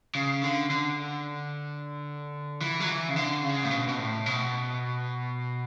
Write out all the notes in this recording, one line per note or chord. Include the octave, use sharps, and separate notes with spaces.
C#3
D3
D3
E3
F#3
E3
C#3
D3
C#3
A2
B2
B2
A2
B2